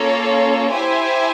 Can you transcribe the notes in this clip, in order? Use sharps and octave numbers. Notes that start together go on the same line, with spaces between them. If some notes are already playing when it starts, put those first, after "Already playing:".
Already playing: A#3 C#4 F4 A4 C#5
E4 G4 C5 E5 G#5